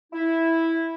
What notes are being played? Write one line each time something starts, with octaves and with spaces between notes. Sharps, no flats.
E4